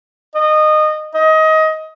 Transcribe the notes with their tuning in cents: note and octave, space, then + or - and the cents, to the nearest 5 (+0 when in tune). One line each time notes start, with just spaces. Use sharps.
D#5 -20
D#5 +20